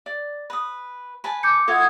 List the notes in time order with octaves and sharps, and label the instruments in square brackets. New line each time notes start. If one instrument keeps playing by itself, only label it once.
[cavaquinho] D5
B4 D#6
B4 G#5 A5
[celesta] D6 G6 C#7
[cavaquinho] F4 F#4 E5 [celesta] A4 [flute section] F#5 D#6 G#6